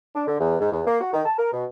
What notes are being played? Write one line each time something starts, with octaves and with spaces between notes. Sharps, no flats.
D4
D3
E2
G#2
E2
A#3
F#4
D#3
A5
A#4
B2